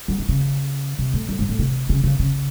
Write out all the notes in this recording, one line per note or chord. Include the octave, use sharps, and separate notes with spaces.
F#3
E3
C#3
C3
A2
F#2
G#2
A2
C3
C#3
C#3
C#3